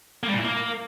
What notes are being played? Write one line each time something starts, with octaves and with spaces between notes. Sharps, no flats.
A#3
G3
A#2
E4
A#3